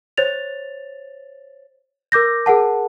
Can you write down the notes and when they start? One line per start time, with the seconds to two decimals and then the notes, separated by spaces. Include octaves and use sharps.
0.18 C5 C#5 A6 F7
2.12 A#4 D6 G6 A#6
2.46 G#4 A#4 F#5 A5